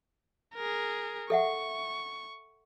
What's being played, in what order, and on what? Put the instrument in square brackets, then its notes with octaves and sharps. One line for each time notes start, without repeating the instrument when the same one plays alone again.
[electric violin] G#4 A#4
[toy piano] A4 E5 F#5 [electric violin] C#6